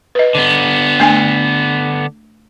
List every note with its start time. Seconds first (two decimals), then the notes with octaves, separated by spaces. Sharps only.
0.15 B4 D#5
0.35 D3 B3
1.00 A3 D4 G#5